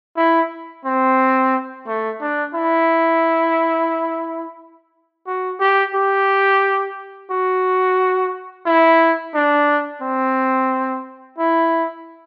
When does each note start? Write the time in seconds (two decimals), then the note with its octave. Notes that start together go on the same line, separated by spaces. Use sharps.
0.17 E4
0.85 C4
1.87 A3
2.21 D4
2.55 E4
5.27 F#4
5.60 G4
5.95 G4
7.31 F#4
8.66 E4
9.34 D4
10.02 C4
11.38 E4